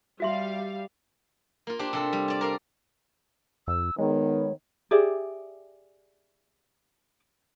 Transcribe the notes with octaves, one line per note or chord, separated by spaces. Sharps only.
G3 F#4 E5 F5 C6
A#3 F4
D4 G4 C5
C3 C4 A4
G3
D5 A5
A#4 D5 F5
F2 E6
D#3 G#3 B3 C#5
G4 G#4 D5 E5